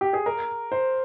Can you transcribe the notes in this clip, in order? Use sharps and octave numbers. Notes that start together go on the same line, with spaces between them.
G4
G#4
A#4
C5